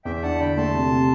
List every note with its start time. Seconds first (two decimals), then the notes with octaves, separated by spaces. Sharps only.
0.05 E2 E5 G5
0.16 G5
0.22 D4 F#5 A5
0.39 D3 G5 B5
0.57 A3 A5 C6
0.74 C3
0.91 C3